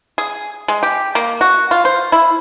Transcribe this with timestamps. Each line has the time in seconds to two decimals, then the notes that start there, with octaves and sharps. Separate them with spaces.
0.18 G#4
0.68 G#3
0.83 G4
1.15 A#3
1.41 F#4
1.71 F4
1.85 C5
2.12 E4